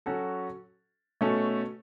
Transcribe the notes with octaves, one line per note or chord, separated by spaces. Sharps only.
F#3 C#4 F#4 A4
B2 A3 C#4 A4